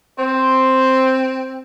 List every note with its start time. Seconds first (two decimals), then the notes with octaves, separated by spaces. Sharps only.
0.19 C4 C5